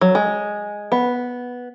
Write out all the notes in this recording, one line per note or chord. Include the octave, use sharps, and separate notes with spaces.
F#3
G#3
B3